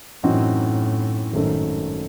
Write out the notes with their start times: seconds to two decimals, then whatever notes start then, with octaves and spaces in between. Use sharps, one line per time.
0.23 F#2 A2 E3 C4 D#4 F#4
1.33 G#1 F#2 D#3 A3